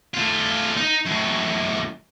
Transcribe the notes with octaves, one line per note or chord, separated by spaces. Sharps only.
A3 F4
D#4
F#2 A2